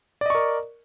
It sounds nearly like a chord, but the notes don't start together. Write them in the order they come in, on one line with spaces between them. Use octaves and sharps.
D5 D#5 C#6 A#4